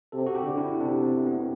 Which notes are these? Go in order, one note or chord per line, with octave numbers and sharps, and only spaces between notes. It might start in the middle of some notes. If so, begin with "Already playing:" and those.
C3 A4
F#4
G4
D3
E4
C3
D4
C4
B3